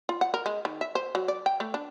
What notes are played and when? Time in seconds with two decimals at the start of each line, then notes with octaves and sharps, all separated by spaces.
0.09 F4
0.21 F#5
0.34 A#4
0.46 G#3
0.65 D#3
0.81 E5
0.95 C5
1.15 F#3
1.28 D5
1.46 G5
1.60 A3
1.74 D4